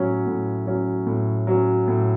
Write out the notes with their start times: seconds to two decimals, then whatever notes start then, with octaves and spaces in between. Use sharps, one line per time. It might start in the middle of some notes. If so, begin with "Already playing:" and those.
Already playing: A2 F#3 C#4
0.27 A2
0.66 F#3 C#4
1.06 A2
1.47 F#3 C#4
1.87 A2